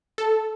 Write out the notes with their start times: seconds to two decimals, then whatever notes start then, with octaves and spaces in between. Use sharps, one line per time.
0.18 A4